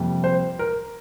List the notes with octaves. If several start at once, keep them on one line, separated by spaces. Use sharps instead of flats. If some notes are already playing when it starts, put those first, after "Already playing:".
Already playing: F2 C3 G3 A#3
C5
A#4